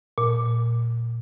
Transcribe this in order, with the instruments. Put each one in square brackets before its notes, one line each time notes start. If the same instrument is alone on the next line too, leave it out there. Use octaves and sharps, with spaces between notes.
[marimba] A#2